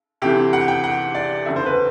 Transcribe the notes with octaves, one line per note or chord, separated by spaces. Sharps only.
D2 C3 E3 G4
F#5
G5
F#5
D5
F#1 E2 D3 E5
C5
B4